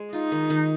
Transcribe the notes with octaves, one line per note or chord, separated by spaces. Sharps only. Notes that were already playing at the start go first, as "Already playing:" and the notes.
Already playing: G#3
D#4 F4
D#3
D#3